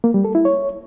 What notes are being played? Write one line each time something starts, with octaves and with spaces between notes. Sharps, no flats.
A#3
G3
A4
E4
C#5